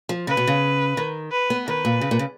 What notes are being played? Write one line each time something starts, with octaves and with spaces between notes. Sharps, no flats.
F3
C#3 B4
B2
C#3
D#3
B4
B3
D#3 B4
A#2
C#3
A#2
C#3